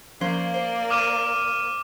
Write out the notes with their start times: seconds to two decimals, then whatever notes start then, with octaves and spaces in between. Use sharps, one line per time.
0.21 F3 A#3 C#4 C5 D5
0.54 C5
0.90 D6 F6 D#7